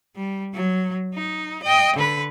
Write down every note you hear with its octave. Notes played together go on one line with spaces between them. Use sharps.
G3
F#3
D#4
D#5 G5
D3 B4